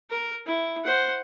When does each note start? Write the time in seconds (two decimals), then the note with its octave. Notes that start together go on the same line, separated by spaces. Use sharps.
0.10 A#4
0.46 E4
0.84 C5 F#5